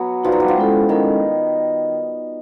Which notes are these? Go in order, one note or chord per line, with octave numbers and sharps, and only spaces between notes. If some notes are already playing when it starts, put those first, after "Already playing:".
Already playing: F#3 B3
F3 D#4 F#4 B4 D5 F#5
F#3
G3
F3
G#3 C#4 E4 A4
D#3 G#3 C#4 E4 A4